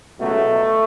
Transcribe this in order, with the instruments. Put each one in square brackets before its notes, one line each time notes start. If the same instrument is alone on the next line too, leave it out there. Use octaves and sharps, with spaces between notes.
[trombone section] C#2 B2 F#3 A3